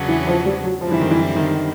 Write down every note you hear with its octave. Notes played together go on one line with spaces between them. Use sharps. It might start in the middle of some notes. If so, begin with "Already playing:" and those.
Already playing: E2 C#3 F#3 B3 D4
E3
F3
G3
F#3
F#2 D3 F3 G3 C4 E4
E3
D#3
E3
D#3